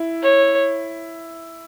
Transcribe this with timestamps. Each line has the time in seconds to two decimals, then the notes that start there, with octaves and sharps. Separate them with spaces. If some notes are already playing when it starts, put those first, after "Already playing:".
Already playing: E4
0.23 C#5